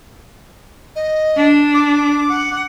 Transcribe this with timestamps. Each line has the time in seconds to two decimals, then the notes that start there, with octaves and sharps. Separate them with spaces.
0.96 D#5
1.37 D4
1.74 D6
2.30 F#5